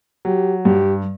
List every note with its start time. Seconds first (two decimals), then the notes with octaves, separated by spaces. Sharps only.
0.25 F#3 G4
0.65 G2 G4